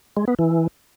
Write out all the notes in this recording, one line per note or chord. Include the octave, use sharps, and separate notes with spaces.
G#3
B3
E3